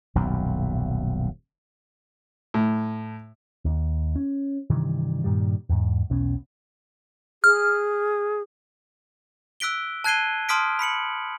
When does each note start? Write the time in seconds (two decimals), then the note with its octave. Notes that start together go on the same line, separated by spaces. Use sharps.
0.15 D#1 B1 F#2
2.54 A2
3.65 D#2
4.16 C#4
4.70 G2 C3 D#3 E3
5.24 G2 A#2 D#3 G3
5.70 E2 G#2
6.10 B1 E2 B2 C#4
7.44 G#4 F6
9.60 E6 F#6 B6 D7 G7
10.04 A5 F#6 G#6 C7 D#7 G7
10.49 A5 C6 D#6 F6 B6 D7
10.79 B5 B6 C#7 F#7